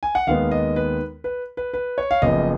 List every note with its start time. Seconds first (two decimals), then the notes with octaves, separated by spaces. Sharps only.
0.03 G#5
0.15 F#5
0.27 D#2 D#3 G#3 B3 F5
0.51 D#5
0.76 B4
1.24 B4
1.57 B4
1.73 B4
1.98 C#5
2.11 F5
2.22 F#1 F#2 F3 B3 D#5